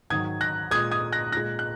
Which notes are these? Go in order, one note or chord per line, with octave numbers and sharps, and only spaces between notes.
G#2 D#3 F#3 D#6 G#6
F#6 A#6
A#2 G#3 D#6 G#6
D#6 G#6
F#6 A#6
A#2 G#3 F#6 A#6
F#6